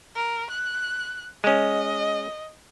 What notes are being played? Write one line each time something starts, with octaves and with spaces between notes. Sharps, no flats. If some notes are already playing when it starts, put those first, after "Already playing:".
A#4
F#6
G#3 C#4 D#5